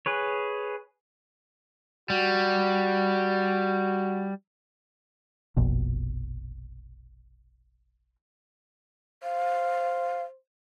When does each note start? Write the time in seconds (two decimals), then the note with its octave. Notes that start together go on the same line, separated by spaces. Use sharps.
0.06 G#4 B4 C#5
2.10 G3 F#4
5.56 F1 A#1 B2
9.23 C5 F5